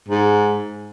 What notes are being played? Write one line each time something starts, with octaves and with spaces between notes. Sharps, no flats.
G#2